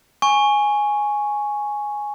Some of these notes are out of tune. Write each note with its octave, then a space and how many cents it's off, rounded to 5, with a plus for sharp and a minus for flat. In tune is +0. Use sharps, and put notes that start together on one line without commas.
G#5 +0 C#6 +0